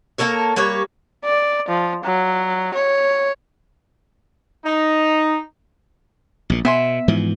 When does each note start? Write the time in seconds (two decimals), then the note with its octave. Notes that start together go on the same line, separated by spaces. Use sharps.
0.18 A#3 A4 A#4 C#5
0.56 G3 A#3 B4 C#5
1.25 D5
1.69 F3
2.04 F#3
2.74 C#5
4.65 D#4
6.50 A#1 A#2
6.65 B2 B3 E5 G#5 C6
7.08 G#2 E3 F3